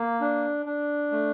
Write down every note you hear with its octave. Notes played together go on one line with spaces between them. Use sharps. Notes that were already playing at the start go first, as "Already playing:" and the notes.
Already playing: A#3
D4
D4
A3